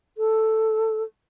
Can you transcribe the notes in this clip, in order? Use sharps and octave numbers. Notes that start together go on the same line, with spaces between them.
A4